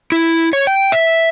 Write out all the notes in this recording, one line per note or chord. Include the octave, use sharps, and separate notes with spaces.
E4
C#5
G5
E5